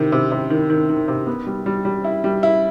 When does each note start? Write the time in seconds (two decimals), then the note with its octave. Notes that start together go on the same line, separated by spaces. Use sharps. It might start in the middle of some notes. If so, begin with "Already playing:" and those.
Already playing: C3 D#3
0.12 C3
0.32 C3
0.50 D#3
0.70 D#3
0.89 D#3
1.08 C3
1.27 B3
1.47 G3
1.66 G3
1.85 G3
2.04 E4
2.24 G3
2.43 E4